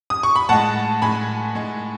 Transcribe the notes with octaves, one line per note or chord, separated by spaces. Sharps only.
D#6
C#6
B5
A2 G#3 F#5 A5
A2 G#3 G#5 B5
A2 G#3